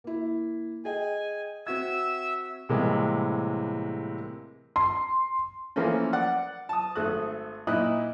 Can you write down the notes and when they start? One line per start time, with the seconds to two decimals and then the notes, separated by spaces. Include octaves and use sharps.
0.04 A#3 E4
0.85 G#4 D#5 G5 G#5
1.67 C4 F#4 E5 E6 G#6
2.69 A2 C3 E3 G3 G#3 A#3
4.76 C6
5.76 E3 F3 A3 A#3 C#4
6.13 D5 F#5
6.69 A5 D#6
6.95 G#1 A3 D#6 F#6
7.67 A#2 D#4 E4 D#6 F#6